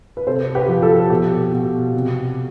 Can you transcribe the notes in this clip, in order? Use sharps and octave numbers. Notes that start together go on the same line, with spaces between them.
B4
C3 A4 C5
G4 B4
F3
A4
B2 G4
B2
C3